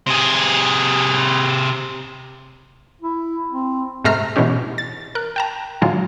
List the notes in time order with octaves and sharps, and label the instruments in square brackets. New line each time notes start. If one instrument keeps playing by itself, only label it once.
[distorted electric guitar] C3 G#4
[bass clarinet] E4
C4
[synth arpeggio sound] G#2 C3 A3 C5 A#5 F6
B2 E3 G#3 C#4 G4
A6
A#4 F#6
G5 A5 A#5
A2 D3 F#3 G#3 F4